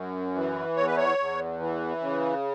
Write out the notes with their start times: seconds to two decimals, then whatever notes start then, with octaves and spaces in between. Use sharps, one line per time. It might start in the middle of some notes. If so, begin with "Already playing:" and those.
Already playing: F#2
0.35 E3
0.76 E2 C#5
0.86 B4
0.97 C#5
1.18 E2
1.59 E3
2.00 C#3